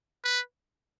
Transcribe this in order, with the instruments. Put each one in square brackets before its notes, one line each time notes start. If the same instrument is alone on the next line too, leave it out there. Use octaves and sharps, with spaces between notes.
[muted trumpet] B4